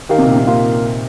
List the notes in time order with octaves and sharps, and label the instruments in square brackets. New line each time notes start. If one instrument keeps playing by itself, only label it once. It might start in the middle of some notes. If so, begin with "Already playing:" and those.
[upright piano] D#3 [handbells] G4 A#4 F5
[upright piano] C3
A#2
C3
[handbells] A#3 F4 A#4 F5